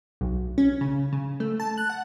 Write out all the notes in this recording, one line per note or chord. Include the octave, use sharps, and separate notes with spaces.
B1
C#4
C#3
C#3
A3
A5
F#6
F#5